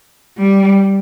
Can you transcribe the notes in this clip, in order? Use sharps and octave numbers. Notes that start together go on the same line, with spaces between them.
G3